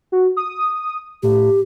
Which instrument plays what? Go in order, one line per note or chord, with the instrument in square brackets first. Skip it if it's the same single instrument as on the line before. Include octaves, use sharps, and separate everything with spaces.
[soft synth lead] F#4
D#6
[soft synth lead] A2 [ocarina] G4